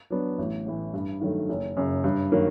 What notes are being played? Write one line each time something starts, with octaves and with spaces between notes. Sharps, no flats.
F#3 B3 D4
A1
A2 E3
G2
D#3 F#3 A3
F#1
F#2 C#3
G2
D#3 F#3 A#3